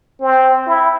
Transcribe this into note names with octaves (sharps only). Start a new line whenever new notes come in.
C4
E4